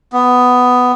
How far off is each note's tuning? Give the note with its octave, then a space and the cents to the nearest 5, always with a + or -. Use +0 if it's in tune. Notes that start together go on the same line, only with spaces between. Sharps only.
B3 +10